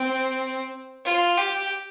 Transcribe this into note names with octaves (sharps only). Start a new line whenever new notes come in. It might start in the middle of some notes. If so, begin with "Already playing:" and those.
Already playing: C4
F4
G4